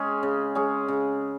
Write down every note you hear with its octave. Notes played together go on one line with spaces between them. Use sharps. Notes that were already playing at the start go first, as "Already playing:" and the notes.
Already playing: G#3 C#4 G#4
C#3
G#3 C#4 G#4
C#3